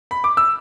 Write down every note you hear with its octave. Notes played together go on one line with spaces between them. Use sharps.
B5
D6
E6